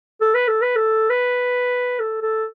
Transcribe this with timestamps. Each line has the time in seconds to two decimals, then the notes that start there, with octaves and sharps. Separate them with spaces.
0.21 A4
0.35 B4
0.48 A4
0.62 B4
0.76 A4
1.10 B4
2.00 A4
2.22 A4